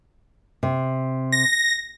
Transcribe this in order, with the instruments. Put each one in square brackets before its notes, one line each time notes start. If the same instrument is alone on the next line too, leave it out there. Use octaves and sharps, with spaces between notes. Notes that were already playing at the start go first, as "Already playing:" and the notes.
[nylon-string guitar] C3
[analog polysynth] A#6